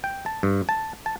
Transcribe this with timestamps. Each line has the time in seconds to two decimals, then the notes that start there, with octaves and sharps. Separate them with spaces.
0.04 G5
0.26 A5
0.43 G2
0.69 A5
1.06 A5